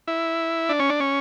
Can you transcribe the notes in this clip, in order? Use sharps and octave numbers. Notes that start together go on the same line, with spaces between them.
E4
D4
C#4
D4
C#4